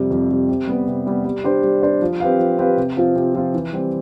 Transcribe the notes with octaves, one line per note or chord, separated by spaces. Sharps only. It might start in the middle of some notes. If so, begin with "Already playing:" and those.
Already playing: F2 C3 G3
F2
C3 G3
C3
G3 B3
C3
G3 B3
G3
D4 G4 C5
G3
D4 G4 C5
F3
C4 G4 B4 F5
F3
C4 G4 B4 F5
C3
F3 C4 F4
C3
F3 C4 F4
E3
G3 C4 G4